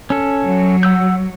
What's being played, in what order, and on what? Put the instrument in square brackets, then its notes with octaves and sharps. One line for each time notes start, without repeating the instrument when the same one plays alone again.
[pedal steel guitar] C#4 A4
[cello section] F#3
[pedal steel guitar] F#5 E6 G6